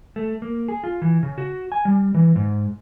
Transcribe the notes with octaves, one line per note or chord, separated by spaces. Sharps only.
A3
A#3
G#4
F4
E3
C#3
F#4
G#5
G3
E3
G#2